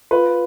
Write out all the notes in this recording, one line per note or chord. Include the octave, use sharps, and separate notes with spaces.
F4 B4